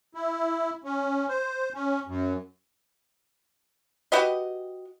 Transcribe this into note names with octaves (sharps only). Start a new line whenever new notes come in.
E4
C#4
C5
C#4
F#2
F#4 G4 B4 D#5